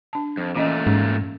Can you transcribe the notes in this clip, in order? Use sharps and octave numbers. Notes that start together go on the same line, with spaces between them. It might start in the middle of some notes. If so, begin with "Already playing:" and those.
D4 A5
F2
A#2 E3 A3 C#4 D#5
G#2 C#4